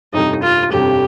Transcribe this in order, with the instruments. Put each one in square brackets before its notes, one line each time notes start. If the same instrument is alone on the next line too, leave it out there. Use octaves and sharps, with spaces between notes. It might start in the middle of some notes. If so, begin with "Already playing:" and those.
[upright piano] G1 F2 C3 G3 [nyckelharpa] D#4
[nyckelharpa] F4
[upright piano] G1 F2 C3 G3 [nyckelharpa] G4